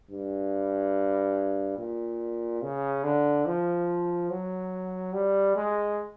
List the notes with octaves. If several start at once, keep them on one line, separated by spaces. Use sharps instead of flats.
G2
A#2
C#3
D3
F3
F#3
G3
G#3